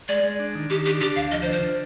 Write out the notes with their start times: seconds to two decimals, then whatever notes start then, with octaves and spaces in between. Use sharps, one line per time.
0.08 G#3 D5
0.24 G#3
0.39 D4
0.55 D#3
0.70 D#3 G4
0.86 D4 G4
1.00 D3 G4
1.16 D2 F5
1.31 F3 D#5
1.42 C5
1.47 D3
1.52 C5
1.63 D3